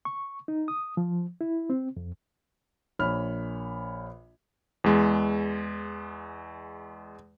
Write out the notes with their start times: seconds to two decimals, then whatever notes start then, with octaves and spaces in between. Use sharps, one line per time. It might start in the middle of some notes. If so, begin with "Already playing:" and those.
0.05 C#6
0.48 D#4
0.68 D#6
0.97 F3
1.41 E4
1.70 C4
1.97 F2
2.99 A#1 C#5 B5 F6
4.84 E2 G#3